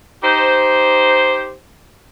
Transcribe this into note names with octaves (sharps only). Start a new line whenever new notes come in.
D#4 G4 C5